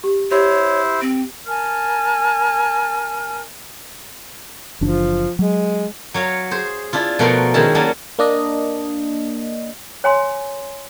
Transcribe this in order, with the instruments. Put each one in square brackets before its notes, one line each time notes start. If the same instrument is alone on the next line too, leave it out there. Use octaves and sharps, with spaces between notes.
[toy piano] G4
[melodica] E4 C5 [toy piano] G4 [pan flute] C#5
[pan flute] C4
[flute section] A#4 G#5 A5 F6
[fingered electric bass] F#1 E3 D4 [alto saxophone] F3
[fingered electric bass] F#3 [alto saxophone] G#3
[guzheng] F#3 C#5 F5
G#4 C5
D4 E4 F4
B2 F3 A3 A#4 F#5 C6
D#3 G#3 C#4 E4 A5
F#3 A#3 C#4 D4 F4 C#5
[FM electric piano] A#3 D4 D#5
[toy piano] C#5 G#5 A#5 C6